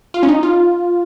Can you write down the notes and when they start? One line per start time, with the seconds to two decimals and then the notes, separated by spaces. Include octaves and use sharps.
0.14 F4
0.23 C#4
0.28 D#4
0.43 F4